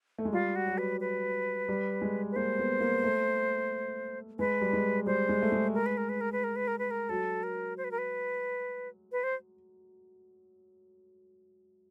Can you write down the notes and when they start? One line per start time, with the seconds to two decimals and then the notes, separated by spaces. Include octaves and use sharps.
0.18 A3
0.25 G#3
0.33 G3 F4
0.56 F#4
0.67 F#3
0.78 B4
1.00 B4
1.68 G3
2.02 G#3
2.31 B4
2.36 A#3 C5
2.59 B3
2.81 A#3
3.04 A3
4.39 G#3 B4
4.61 G3
4.73 G#3
5.06 G3 C5
5.29 G#3
5.42 A3
5.52 G#3
5.74 A#4
5.86 B4
5.98 A#4
6.09 B4
6.21 A#4
6.32 B4
6.44 A#4
6.56 B4
6.68 A#4
6.79 B4
6.91 A#4
7.09 F#3 A4
7.43 A#4
7.78 C5
7.84 B4
7.91 A#4
7.98 B4
9.12 B4
9.23 C5